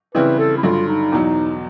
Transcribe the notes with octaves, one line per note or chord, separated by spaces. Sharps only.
C#3 E3 G3 C4 E4 B4
A4
E4
G2 D3 F#3 F4
D#4
E2 B2 F#3